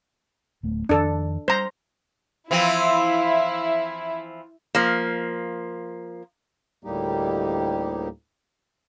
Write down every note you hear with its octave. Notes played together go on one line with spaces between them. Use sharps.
D1 A3 B3
F2 D#3 D4 A4
G3 C5 A#5
E3 F3 C4 E4
F3 A#3
D2 A2 G3 A#3 D#4 G4